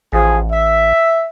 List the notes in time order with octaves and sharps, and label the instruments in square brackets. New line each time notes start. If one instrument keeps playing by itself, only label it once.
[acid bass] A1 [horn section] F3 G#4
[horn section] E5